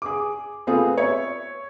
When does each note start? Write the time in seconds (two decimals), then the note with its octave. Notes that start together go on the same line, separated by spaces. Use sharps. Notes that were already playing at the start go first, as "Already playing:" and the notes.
0.02 G#4 D6
0.67 A3 B3 C4 F4 G#4
0.97 C#5 E5